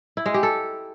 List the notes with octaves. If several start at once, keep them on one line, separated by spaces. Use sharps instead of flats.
E4
G#3
G4
A4